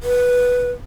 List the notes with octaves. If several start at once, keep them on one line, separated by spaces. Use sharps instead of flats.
B4